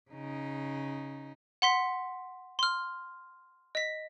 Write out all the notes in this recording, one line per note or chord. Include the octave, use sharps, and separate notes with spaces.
C#3 D#4
F#5 C6 B6
C6 F6
D#5 B6